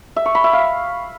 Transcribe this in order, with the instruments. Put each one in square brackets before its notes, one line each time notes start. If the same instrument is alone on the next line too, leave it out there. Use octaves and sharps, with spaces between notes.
[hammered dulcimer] E5
C#6
B5
E5
F5